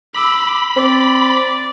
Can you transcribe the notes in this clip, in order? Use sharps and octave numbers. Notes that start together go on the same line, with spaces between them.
B5 D6 E6
C4 D5